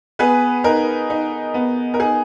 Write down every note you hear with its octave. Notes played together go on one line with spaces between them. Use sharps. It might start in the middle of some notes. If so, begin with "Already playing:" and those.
B3 G#4 B4
D#4 A#4
D#4
B3
A#4
D#4 G#4